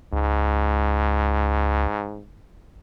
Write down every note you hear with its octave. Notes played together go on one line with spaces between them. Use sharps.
C#2 G#2